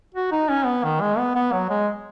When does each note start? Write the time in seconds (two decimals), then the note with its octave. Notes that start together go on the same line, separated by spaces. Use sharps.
0.14 F#4
0.32 D#4
0.49 C#4
0.66 B3
0.84 D#3
1.01 G#3
1.18 B3
1.35 B3
1.52 F#3
1.70 G#3